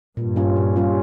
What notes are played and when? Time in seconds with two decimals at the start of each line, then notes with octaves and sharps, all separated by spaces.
0.17 G2 A#2
0.36 G3 C#4 F4
0.56 A#2
0.76 G3 C#4 F4